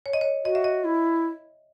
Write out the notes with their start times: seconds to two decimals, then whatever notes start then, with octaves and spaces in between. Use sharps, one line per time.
0.06 C#5
0.13 D#5
0.21 C#5
0.45 F#4 D#5
0.55 E5
0.64 D#5
0.84 E4